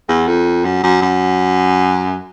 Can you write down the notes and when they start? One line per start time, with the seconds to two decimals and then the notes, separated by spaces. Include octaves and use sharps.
0.09 E2
0.28 F2
0.65 F#2
0.84 F#2
1.02 F#2